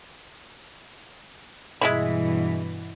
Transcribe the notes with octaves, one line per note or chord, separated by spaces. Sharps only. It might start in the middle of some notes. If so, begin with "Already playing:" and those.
G2 B2 E3 G#3 E4 B5